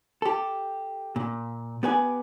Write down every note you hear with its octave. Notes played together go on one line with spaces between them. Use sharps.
G4 A4
A#2
B3 G4 B4 D5 G#5